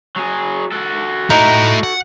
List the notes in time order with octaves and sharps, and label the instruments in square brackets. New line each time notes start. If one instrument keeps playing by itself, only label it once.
[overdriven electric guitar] F#3 G#4
F#4 A4
[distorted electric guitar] A3 E4 [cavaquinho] D#4
[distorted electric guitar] F#5